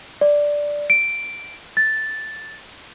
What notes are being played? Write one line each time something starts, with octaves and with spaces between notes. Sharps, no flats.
D5
D7
A6